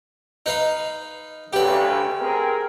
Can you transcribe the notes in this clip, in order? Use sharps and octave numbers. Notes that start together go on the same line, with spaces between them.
D#4 B4 F5
D2 C#3 G4 B4
C4 G#4 A#4